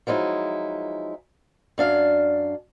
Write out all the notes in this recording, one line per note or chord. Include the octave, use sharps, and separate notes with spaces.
F3 F#3 G#3 D#4 E4
F#2 D4 F5